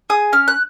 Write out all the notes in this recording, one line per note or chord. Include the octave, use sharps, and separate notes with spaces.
G#4 D#6
C#4 F6
F#6